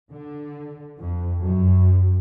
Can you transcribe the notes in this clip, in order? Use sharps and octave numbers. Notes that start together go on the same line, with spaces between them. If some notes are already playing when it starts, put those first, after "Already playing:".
D3
F2
F#2